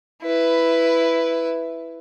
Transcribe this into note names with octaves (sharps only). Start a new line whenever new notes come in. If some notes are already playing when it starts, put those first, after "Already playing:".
E4 B4